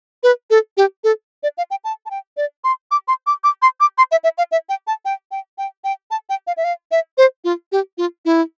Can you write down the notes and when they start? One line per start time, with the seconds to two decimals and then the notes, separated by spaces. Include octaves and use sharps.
0.23 B4
0.50 A4
0.77 G4
1.04 A4
1.43 D5
1.58 F5
1.71 G5
1.84 A5
2.06 A5
2.11 G5
2.37 D5
2.64 C6
2.91 D6
3.08 C6
3.27 D6
3.44 D6
3.62 C6
3.80 D6
3.98 C6
4.12 E5
4.24 E5
4.38 F5
4.52 E5
4.69 G5
4.87 A5
5.05 G5
5.31 G5
5.58 G5
5.84 G5
6.11 A5
6.29 G5
6.47 F5
6.57 E5
6.64 F5
6.91 E5
7.18 C5
7.44 F4
7.72 G4
7.98 F4
8.25 E4